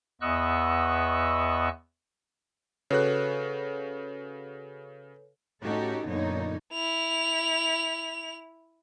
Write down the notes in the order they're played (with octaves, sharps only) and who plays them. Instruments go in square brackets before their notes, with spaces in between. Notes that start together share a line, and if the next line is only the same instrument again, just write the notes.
[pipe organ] E2 B3 D#5 C#6 E6 F#6
[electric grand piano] C#3 F#4 F#6 [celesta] A4 B4 C#5
[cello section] A2 C#4 D#4 F#4 G4 A4
F#2 A#2 D3 B3 D#4 C#5
[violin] E4 F7